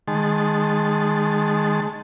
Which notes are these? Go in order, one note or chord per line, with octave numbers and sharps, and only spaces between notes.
D#3 G#3 A5